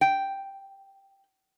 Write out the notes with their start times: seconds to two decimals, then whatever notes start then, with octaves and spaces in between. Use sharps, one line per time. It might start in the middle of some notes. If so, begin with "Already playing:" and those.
0.01 G5